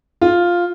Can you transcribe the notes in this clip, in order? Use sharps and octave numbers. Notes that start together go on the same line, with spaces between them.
F4